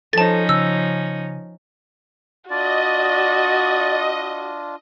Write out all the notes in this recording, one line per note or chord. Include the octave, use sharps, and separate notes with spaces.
F3 C#4 D#4 A4 C5 A5 A6
C#3 E6
D4 F4 F#4 D5 D#5